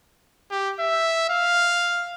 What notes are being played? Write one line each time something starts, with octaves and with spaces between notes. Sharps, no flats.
G4
E5
F5